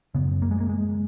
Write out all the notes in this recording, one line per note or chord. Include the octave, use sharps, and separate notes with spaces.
F#2 C#3 B3
A#3
G#3
A#3
G#3